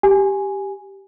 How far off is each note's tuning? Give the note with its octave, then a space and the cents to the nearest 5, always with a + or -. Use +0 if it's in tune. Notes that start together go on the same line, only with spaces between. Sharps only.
G4 +0 G#5 +0